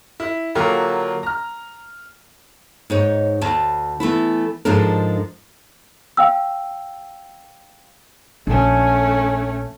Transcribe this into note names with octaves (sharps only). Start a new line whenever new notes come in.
E4
D3 F#3 A#3 F4 G4
A#5 F6
G#2 D#4 C#5
D2 A5
E3 A3 B3 E4
G#2 F3 G#3 D4 A4 A#4
F5 G5 E6
A#1 A3 C#4 D4 G#5